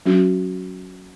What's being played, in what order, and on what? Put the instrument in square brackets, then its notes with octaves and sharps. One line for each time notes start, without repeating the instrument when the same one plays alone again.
[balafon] F#3 C#4 F#4